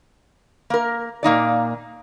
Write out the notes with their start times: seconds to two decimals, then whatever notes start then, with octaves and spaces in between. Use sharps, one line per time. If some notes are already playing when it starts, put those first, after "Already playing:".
0.70 A#3 A#4
1.23 A#2 A#3 D#4 D5